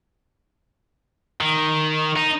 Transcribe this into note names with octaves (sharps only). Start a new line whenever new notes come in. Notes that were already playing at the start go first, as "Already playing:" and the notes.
D#3
D#4